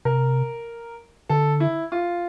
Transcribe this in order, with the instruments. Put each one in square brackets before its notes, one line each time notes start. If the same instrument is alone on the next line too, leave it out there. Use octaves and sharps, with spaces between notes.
[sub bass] C3 [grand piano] A#4
[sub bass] D3 [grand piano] A4
[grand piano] E4
F4